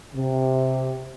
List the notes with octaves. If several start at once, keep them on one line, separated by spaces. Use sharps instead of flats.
C3